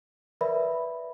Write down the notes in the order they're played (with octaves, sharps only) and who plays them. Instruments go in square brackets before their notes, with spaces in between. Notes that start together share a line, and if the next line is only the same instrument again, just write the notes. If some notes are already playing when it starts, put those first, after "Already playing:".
[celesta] A#4 B4 D5 E5 B5